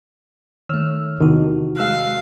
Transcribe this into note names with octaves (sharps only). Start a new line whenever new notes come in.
D#3 A3 C#5 E6 F6
E2 C3 D#3 E3 F#4
G#3 F5 E6 F#6